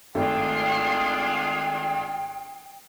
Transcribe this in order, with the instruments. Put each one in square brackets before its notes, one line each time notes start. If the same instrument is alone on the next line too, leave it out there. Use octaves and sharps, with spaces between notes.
[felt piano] G#1 A3 [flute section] D4 F4 G#4 [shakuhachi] G5